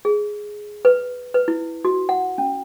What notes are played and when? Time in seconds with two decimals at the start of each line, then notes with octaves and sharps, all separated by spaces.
0.05 G#4
0.85 B4
1.34 B4
1.48 E4
1.85 F#4
2.09 F#5
2.38 C#4